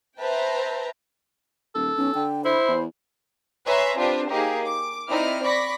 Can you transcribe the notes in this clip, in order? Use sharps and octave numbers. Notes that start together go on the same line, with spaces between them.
B4 C5 E5 G5 A5 A#5
D#1 A4
B1 C#4
D3 G5
E4 C5 B5
E2
B4 C#5 E5 G#5 A#5 C6
C4 D4 F4 G4 B4 C5
A#3 D#4 G4 G#4 A#4
D6
C4 D#4 E4 D5 F6
D5 B5 C#6 A#6 B6